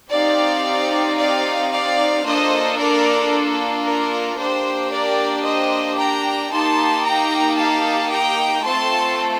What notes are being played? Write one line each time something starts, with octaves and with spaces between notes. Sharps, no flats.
C4 D#4 G4 D5 F5
D5 F5
D5 F5
A#3 D4 F4 A4 C5 D#5
A#4 D5
A#4
A#3 D4 G4 C5
A#4 D5
C5 D#5
G5 A#5
A#3 D#4 G4 A5 C6
G5 A#5
F5 A5
G5 A#5
A3 C4 F4 A4 A5 C6